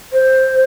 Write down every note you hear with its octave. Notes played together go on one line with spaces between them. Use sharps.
C5